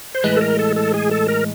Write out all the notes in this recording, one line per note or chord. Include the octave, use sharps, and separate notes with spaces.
C5
A2 E3 G#3 B4
A4
A#4
A4
A4
G#4
A4
A#4